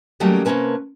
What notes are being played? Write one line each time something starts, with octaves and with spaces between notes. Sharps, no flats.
D#3 F#3 G3 A3 A#3 C#4
C3 A#3 C4 C#4 B4 A5